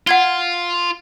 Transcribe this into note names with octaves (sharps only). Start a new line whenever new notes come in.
F4 F#5 G#6 G7